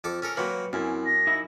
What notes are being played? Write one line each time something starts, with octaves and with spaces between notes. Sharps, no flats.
F2 A4 D6
C#4 A4 A#4
F#3 A#3 B4 C#5 G5
F#2 C4 E4 G#5
A#6
D#4 E4 E5